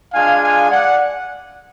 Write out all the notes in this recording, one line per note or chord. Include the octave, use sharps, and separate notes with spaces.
G#3 D4 F4 F5 G#5
F5 G#5
D5 F#5